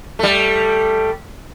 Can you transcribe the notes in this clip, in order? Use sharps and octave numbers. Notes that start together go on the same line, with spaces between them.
G3 A3